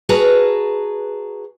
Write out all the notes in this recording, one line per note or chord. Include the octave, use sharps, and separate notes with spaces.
F#4 G#4 B4 A5 A#5